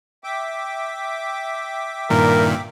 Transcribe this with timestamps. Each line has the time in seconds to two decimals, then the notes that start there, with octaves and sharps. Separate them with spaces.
0.24 E5 G5 D6
2.10 G2 A#2 D#3 A#4